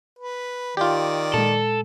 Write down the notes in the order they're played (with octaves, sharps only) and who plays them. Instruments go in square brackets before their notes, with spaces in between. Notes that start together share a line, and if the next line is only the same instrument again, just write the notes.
[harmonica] B4
[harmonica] D#3 D5 [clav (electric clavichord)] F4 G4
[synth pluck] A#2 G#3 [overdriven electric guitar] A4